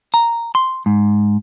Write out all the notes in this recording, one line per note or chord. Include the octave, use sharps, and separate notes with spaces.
A#5
C6
G#2